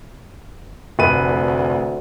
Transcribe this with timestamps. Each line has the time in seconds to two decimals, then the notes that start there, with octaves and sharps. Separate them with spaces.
0.99 F1 D2 B4 D#7